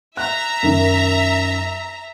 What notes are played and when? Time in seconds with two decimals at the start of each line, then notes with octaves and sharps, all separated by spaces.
0.17 E5 A#5 F#6
0.63 F#2 D#3